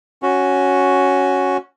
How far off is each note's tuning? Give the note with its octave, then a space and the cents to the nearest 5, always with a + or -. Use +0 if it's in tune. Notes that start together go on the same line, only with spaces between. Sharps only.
C#4 +0 F#4 +0